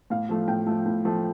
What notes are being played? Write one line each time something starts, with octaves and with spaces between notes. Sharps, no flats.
A2 F5
F3 A3
A2 G5
F3 A3
A2
F3 A3